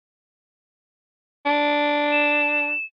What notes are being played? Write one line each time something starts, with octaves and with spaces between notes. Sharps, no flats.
D4
E7